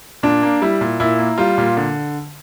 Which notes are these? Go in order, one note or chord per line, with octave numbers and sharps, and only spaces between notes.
A#2 D4
A#3
G3 E4
A#2
A#2 E4
A#3
G3 F4
A#2
D3